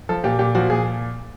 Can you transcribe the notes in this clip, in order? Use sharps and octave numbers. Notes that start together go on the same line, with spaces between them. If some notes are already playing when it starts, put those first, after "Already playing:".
F3 A4
A#2 G4
A#2 G4
F3 F#4
A#2 G#4